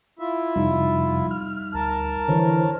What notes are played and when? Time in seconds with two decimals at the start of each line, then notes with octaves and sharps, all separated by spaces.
0.19 E4 F4 E5
0.56 F2 C3 F3 G3 D#4
1.31 F6
1.74 D2 A#4 A5
2.28 D3 E3 E4 C5 C#5